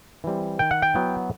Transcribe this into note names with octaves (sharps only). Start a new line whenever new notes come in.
E3 G3 C4
D#3 G5
F#5
G5
F#3 B3 E4